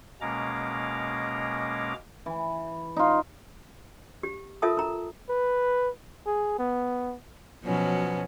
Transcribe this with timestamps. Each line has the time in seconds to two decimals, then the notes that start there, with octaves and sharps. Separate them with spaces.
0.21 B2 G#3 A#3 C#4 A#5 D6
2.26 E3
2.96 D#4 F4
4.23 G4
4.62 F4 A4 A#4 E5 A5 D#6
4.77 A#4 A#5
5.29 B4
6.26 G#4
6.59 B3
7.64 B2 F3 F#3 B3 C#4